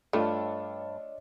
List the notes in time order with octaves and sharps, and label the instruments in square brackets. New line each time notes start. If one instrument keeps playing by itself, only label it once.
[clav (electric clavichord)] G2 [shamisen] A3 [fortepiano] D4 F4 A4 [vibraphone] C#5 D#5